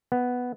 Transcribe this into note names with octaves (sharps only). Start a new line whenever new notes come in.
B3